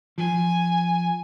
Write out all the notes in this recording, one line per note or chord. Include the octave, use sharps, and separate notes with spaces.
F3 G#5